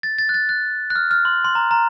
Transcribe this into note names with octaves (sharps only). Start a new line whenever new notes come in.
A6
A6
F#6
A6
F#6
F#6
F6
F6
C6
C6
A#5
A#5